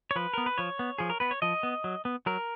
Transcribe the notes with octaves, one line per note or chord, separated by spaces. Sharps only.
C#5
F3 B4
B3 A#4
B4
F3 C#5
B3
F3 G#4
A#4
B3 B4
C#5
F3 D#5
B3
F#3
B3
F#3 A#4